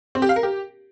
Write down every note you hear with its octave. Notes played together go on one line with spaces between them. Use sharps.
C4
G4
F5
A#4
G4